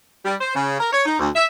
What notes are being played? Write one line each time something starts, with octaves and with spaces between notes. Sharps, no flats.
G3
C5
C#3
A#4
C#5
D#4
D2
E5